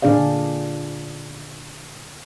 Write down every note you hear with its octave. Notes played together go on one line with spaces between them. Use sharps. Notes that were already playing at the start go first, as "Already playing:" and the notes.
A#2 D3 D4 G#4 D5 F5